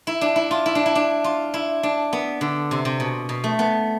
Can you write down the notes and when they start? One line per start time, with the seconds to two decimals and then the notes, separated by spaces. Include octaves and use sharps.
0.07 E4
0.21 D4
0.36 E4
0.51 F4
0.66 E4
0.75 D4
0.86 E4
0.95 D4
1.24 F4
1.54 E4
1.83 D4
2.13 B3
2.41 D3
2.71 C3
2.85 C3
3.00 B2
3.29 B2
3.44 A3
3.59 B3